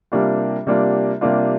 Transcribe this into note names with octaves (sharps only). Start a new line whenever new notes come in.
C3 G3 A#3 D4 F4
C3 G3 A#3 D4 F4
C3 G3 A#3 D4 F4